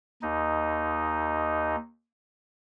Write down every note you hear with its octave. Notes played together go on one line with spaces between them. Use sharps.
D#2 D#4